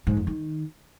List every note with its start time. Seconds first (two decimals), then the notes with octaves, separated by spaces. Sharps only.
0.07 G#2
0.17 F2
0.27 D#3